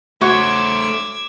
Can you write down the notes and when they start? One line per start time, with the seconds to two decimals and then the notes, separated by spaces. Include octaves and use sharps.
0.21 A3 F#4 C5 C#5 D6 E6 G#6